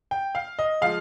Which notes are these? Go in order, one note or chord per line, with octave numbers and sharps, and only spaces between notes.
G5
F5
D#5
F3 G#3 F5